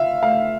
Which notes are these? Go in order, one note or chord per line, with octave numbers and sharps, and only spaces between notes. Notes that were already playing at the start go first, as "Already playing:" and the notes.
Already playing: F4 E5 F5
A3 F5